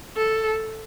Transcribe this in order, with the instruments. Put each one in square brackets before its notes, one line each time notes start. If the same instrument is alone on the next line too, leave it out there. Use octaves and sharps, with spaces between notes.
[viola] A4